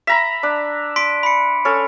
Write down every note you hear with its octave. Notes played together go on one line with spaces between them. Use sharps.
E5 A#5 B5 B6
D4
C6 B6 D7
B5 C#7
C#4 A4